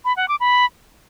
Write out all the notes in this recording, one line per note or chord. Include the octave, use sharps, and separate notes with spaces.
B5
F#5
D6
B5